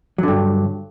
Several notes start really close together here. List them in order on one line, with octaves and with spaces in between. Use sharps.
F#3 D3 G2